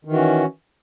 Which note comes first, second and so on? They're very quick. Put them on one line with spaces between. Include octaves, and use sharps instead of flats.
D#3 E3 F#4 C#4